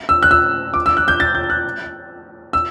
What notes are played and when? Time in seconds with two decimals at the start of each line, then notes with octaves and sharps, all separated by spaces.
0.09 E6
0.23 F#6
0.31 E6
0.74 D6
0.86 E6
0.97 F#6
1.08 G6
1.20 A6
1.35 G6
1.50 F#6
2.53 E6